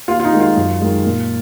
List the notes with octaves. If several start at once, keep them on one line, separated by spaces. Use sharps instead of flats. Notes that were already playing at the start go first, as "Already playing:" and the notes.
D#2 F4
F4
D#4
D#3 G#3
F4
F#2
D#3 G#3
A#2